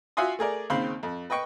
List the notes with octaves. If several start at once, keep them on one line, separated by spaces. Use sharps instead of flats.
F4 F#4 E5 G#5 C6 D#6
A3 G#4 A#4 D5
D#2 C#3 C4 F5 B5 C6
F2
B4 D#5 G5 C#6